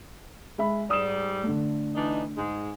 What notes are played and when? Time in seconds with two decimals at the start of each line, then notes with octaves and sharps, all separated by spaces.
0.58 G#3 E5 B5
0.90 G#2 G3 D#6 E7
1.43 D3 A3
1.95 E3 D4 D#4
2.37 G#2 G#3